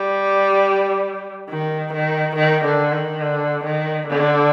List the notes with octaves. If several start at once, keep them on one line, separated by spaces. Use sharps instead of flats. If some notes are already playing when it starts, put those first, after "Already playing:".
Already playing: G3
D#3
D#3
D#3
D3
D#3
D3
D#3
D3